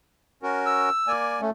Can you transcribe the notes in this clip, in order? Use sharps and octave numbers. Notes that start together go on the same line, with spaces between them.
C#4 F#4 A#4
E6
A#3 D5 G#5
A3 C#4